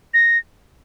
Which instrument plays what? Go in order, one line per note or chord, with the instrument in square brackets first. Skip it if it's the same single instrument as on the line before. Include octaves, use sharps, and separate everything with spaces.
[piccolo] A#6